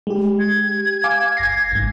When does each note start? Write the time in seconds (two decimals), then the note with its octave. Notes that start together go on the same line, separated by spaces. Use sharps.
0.07 G#3 G4
0.39 G#6
1.04 F5 G#5 D6
1.37 G1 A#6 C7
1.72 A1 G#2